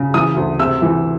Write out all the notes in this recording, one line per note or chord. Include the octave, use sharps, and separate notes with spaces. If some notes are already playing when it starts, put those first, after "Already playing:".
Already playing: C#3
E3 D#6
D2
C3 E6
E3